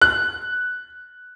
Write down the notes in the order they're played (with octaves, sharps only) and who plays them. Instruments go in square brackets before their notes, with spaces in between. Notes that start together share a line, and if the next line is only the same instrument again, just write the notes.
[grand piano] F#6